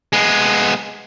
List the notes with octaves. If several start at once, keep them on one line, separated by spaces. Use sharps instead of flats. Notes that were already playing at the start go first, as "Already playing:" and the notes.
G#3 B3